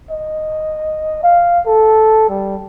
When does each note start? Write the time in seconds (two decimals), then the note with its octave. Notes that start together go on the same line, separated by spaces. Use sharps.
0.11 D#5
1.23 F5
1.66 A4
2.29 G3